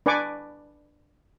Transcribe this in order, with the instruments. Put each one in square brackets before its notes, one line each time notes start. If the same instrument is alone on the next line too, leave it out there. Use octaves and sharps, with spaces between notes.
[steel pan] D4 B4 D5 G#5 C#6 D6